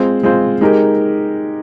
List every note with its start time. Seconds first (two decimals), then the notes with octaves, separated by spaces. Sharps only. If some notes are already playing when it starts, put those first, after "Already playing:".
Already playing: G#3 C4 F4 C5
0.23 G#3 C4 F4 C5
0.61 G#3 D#4 G4 A#4